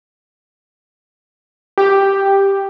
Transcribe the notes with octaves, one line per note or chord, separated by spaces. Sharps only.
G4